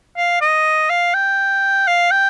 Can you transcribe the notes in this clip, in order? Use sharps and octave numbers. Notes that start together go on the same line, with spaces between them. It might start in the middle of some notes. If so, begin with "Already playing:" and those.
F5
D#5
F5
G5
F5
G5